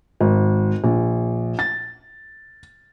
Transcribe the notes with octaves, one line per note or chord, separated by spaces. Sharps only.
G#1
A#1
A6